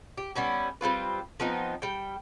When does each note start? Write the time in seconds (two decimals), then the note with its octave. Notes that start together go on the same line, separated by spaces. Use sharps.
0.18 G4
0.35 G3 B3 C#4 E4
0.81 G3 C4 F4 B4
1.40 F3 B3 C4 D#4
1.82 G3 G5